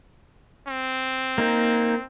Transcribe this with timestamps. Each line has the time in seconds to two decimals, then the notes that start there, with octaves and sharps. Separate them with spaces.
0.68 C4
1.38 A#3 D#4